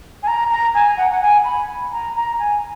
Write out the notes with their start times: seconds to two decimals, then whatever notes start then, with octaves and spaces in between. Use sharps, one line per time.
0.23 G#5
0.27 A#5
0.51 A#5
0.75 G#5
0.97 F#5
1.11 F#5
1.21 G#5
1.44 B5
1.92 A#5
2.16 A#5
2.39 G#5